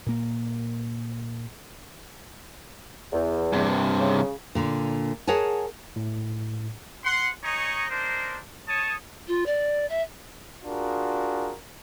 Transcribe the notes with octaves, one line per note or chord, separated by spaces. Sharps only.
A#2 A#3
E2
G2 C3
C#3
A#2 D3
G#4 A#4 C#5 F#5 G#5 A5
A2
F#5 C6
D#4 G#4 C#5 D#5 A#5 C#6
D4 D#4 A#4 C5
C#5 A5 D#6
F4
D5
E5
D4 F4 F#4 G#4 A#4